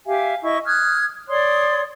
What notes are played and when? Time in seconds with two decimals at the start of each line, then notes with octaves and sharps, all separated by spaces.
0.06 G4 E5 F5 G#5
0.43 E4 D#5 C#6
0.66 D#6 F6 F#6 G#6
1.28 C#5 D5 C6 D#6